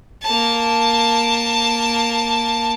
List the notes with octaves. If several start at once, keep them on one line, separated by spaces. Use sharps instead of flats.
A#3 A5